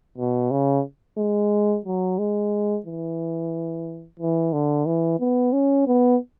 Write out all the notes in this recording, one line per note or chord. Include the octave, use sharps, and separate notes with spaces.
B2
C#3
G#3
F#3
G#3
E3
E3
D3
E3
B3
C#4
B3